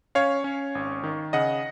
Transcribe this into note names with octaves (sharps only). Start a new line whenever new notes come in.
C#4 C#5 F5
C#4
G#1
D#3
C#3 D#5 F#5